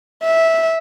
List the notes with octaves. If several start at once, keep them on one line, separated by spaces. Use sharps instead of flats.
E5